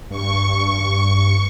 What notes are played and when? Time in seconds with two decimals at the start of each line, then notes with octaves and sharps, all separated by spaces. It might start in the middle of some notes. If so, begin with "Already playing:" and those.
0.10 G2 C#6